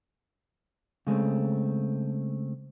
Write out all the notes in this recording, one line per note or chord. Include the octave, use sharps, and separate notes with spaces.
C#3 G#3 A3 C4